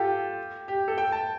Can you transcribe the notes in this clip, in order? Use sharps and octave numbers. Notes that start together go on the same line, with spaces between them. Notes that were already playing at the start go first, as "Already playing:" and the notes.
Already playing: F4 G4 A4
G4
A4
G5
A5